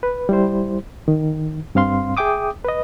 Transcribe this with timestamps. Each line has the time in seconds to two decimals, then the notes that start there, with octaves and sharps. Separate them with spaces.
0.03 B4
0.29 G3 E4 C5
1.08 D#3
1.75 G2 C4 F5 C6
2.17 G#4 E5 G5 D6 D#6
2.65 B4 D#5